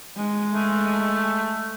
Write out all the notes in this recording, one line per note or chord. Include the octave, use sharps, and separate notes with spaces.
G#3
A3